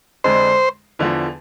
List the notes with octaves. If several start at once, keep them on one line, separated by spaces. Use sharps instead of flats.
F2 D3 G#3 D4 C5
E2 D3 F3